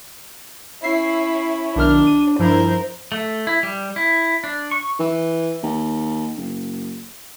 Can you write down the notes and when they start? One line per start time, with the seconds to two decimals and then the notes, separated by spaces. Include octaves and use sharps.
0.83 C#4 E4 E5 C7
1.76 B1 D#3 D4 F6
2.07 D#7
2.39 G2 F3 E4 A#4 C5
3.12 A3
3.47 E4
3.63 G3
3.96 E4
4.44 D4
4.71 C#6
5.00 E3
5.63 D#2
6.38 F#1